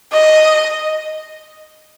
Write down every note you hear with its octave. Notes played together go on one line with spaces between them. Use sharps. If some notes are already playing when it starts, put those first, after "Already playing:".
D#5